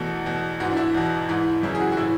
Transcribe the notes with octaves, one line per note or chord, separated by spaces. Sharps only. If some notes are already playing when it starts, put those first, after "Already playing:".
Already playing: E2 B2 A3
E2 B2
G#2 E3 F#4
D4
E4
E2 B2
G#2 E3
F#2 C#3 E3 E4
G#4
F#4
F#4
A2 E3 E4